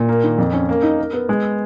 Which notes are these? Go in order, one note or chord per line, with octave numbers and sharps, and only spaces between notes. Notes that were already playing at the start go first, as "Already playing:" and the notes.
Already playing: A#2
A#3
D#3
F2
C#4
A#3
D#4
A#4
B3
G#3